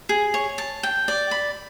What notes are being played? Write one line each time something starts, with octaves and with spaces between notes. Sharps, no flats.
G#4
C#5
A5
G5
D5
B5